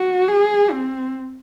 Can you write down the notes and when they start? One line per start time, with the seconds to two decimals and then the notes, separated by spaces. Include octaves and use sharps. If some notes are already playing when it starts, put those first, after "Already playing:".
Already playing: F#4
0.28 G#4
0.71 C4